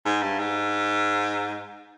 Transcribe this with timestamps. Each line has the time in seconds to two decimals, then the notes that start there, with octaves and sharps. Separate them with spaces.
0.05 G#2
0.22 G2
0.39 G#2